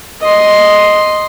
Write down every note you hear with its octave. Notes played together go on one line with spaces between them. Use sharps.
D#5 C6